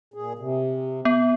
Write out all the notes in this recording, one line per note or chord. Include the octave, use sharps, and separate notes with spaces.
A#2 G#4
C3
B3